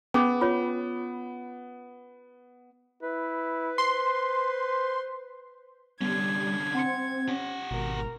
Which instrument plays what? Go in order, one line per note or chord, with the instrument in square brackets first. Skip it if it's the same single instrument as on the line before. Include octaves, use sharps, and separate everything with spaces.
[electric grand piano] B3 [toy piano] C#4 G#4 D6
[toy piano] F4 C#5
[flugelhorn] E4 [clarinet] B4
[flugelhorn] C5 [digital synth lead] C6
[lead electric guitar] D3 C#4 [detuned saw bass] G3 [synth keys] B3 [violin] G#6
[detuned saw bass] C4 [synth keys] F#5 C6 C#7
[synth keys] C#4 [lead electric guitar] G4 F#5
[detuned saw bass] G#1 [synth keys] B2 [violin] A#4